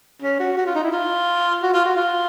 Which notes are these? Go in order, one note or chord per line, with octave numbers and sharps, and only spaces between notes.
C#4
F#4
F#4
F4
D#4
E4
F4
F#4
F4
F#4
F4